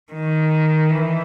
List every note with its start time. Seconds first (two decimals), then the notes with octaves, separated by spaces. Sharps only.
0.12 D#3
0.89 E3